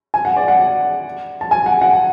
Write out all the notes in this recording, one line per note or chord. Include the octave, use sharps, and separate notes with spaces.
G#5
F#5
D5
F#5
A5
G#5
F#5
F#5